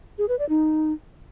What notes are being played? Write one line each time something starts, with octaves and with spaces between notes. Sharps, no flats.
G#4
B4
D5
D#4